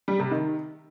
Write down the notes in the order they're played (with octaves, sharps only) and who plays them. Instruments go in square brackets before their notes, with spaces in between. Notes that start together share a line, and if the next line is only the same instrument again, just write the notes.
[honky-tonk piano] G3
C3
D#3